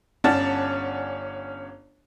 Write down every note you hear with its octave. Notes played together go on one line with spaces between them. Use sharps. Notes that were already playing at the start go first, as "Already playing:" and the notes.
G1 C#4 D5 F#5 A5 A6